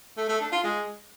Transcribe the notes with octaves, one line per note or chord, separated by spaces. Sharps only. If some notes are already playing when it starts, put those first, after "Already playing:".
A3
A3
D4
F4
G#3